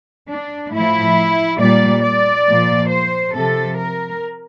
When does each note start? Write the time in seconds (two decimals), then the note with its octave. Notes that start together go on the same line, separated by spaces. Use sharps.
0.29 D4
0.72 A2 F3 E4
1.59 A#2 G3 D5
2.02 D5
2.46 A#2 F3
2.90 C5
3.33 C3 F3 A4
3.77 A#4